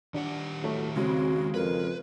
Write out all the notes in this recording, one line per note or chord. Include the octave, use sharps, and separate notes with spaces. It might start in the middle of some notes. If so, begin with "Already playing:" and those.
D#3 D4 G4 F#5
A2 F#3 A3
C#3 G#3 C4 F#4
F2 A#4 B4